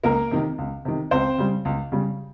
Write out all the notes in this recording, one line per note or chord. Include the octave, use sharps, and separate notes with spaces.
C#2 A#3 A#4
C3 D#3
C#2
C3 D#3
C#2 C4 C5
C#3 G3
C#2
C#3 G3